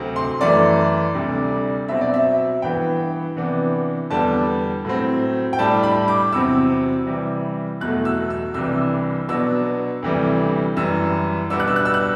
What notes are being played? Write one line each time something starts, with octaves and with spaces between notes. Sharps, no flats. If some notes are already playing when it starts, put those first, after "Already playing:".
Already playing: D2 C3 F#3 C4
C6
F#2 E3 A3 D5
D2 C3 G3 D4
B2 F#3 C4 E5
D5
E5
G2 E3 B3 G5
C3 E3 B3 D4
E2 D3 G3 B3 D4 A5
A2 F#3 C4
G5
A2 G3 D4 A5
B5
D6
E2 C3 F#3 C4 E6
C3 E3 G3
E2 B2 F#3 A3 F#6
E6
E6
C2 C3 E3 G3 D4 E6
B2 F#3 B3 D4 E6
D2 C3 E3 G3
F#2 E3 G3 E6
B2 G3 B3 D4 E6
F#6
E6
F#6
E6
F#6